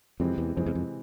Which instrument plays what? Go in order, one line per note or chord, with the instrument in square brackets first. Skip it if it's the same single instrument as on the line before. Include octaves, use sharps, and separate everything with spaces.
[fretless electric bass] F2 [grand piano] C3 E3 G#3 C4
[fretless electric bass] E2
[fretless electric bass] F2 [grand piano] C3 E3 G#3 C4
[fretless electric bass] E2
F2